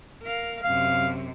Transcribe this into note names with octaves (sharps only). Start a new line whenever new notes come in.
A#4 F5
F#2 C3 F5